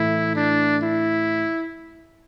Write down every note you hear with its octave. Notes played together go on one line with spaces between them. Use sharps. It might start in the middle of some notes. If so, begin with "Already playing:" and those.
Already playing: A2 E3 A3 E4
D4
E4